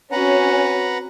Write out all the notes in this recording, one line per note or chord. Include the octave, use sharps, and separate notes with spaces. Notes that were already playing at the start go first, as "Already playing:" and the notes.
C4 C#4 F#4 B4 F#5 A#5